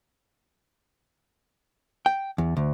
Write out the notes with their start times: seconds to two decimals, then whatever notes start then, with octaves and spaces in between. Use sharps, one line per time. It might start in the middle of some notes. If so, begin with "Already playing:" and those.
2.06 G5
2.38 E2
2.57 D2